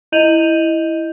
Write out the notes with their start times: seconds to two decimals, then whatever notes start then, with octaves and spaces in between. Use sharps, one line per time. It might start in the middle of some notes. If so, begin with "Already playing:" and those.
0.12 E4 D#5 G6 D#7 F7 F#7